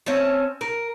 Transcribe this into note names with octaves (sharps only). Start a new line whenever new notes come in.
C4 C#4 E5 A5
A#4